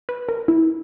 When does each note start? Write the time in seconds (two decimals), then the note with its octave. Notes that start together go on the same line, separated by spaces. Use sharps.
0.09 B4
0.29 A#4
0.48 E4